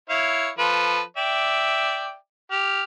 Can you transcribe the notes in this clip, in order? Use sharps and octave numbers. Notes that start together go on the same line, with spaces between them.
E4 C#5 F5
F3 A4 B4
D5 E5 G5
G4 F6